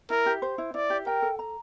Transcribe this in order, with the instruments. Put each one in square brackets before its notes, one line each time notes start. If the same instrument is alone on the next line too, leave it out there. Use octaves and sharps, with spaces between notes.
[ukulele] E4 [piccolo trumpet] A#4
[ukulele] G4
C5
E4
[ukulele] E4 [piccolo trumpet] D5
[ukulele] G4
[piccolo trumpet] A#4 [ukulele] G5
[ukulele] A4
A#5